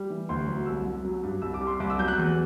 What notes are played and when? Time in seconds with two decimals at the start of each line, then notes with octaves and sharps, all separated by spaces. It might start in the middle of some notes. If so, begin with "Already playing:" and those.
Already playing: G3
0.10 E3
0.29 D2 C6
0.47 F#3
0.66 C2 E6
0.86 F#3
1.05 F#3
1.23 G2
1.42 C2 E6
1.54 D6
1.61 G3
1.67 C6
1.80 C2 D6
1.90 E6
1.99 F#3 G6
2.08 F#6
2.18 E2